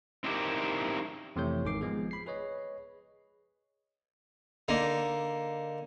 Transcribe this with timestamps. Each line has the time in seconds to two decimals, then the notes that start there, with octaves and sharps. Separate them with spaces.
0.24 C4 D#4 E4 G4 A#4 D5
1.36 F2 C3 E3 A3 C#5 G6
1.64 G#1 G#2 D#3 D6 C7
1.81 F3 G#3 B3 G#4
2.11 B5 C7
2.26 G#4 B4 C#5 D#5
4.68 D3 A#3 D#4